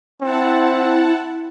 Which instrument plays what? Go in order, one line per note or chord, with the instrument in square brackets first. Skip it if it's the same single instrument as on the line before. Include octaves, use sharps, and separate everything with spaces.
[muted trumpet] C4 [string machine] E4 F#5 A5